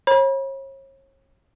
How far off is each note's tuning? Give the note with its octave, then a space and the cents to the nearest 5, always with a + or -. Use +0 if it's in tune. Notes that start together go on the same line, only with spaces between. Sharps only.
C#5 -40 B5 -40